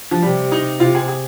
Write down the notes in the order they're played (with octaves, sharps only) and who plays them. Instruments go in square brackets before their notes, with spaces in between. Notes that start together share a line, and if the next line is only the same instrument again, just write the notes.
[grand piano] F3
[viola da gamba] C3 [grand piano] G3
[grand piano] D#4
[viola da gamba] C3 [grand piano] F4
[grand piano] G#4
G#4